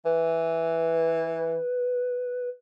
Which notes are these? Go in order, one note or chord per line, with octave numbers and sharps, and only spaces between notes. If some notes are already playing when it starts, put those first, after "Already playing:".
E3 B4